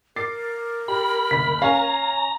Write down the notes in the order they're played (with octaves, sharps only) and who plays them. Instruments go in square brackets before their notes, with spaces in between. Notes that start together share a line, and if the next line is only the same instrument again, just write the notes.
[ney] A#4 [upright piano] D6 A6 C7
[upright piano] G4 [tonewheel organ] B5
[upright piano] F#1 D2 [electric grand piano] B6
[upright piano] C#4 G#5 C#6 [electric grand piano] F5 [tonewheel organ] A#5